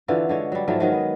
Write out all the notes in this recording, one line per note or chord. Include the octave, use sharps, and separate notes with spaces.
D3 E3 F4 F#4
D3 G#3 C#5
F#3 G3
G#2 F3 F#3 A3
D#3 F#3 G#3
B3 D#5